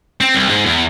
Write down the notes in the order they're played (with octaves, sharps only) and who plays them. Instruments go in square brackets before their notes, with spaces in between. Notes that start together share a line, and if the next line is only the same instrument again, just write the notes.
[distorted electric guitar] C4
C2
G#2
E2